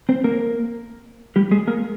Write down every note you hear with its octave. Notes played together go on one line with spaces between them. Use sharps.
C4 C5
A#3 A#4
G3 G4
G#3 G#4
A#3 A#4